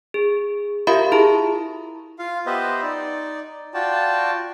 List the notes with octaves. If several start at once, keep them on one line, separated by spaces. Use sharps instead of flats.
G#4
F4 G4 A#4 E5 F5 B5
E4 G#4 A#5
F4 F5
B3 G4 B4 C5 D#5 E5
D#4 D5
F4 F#4 D5 G5 A5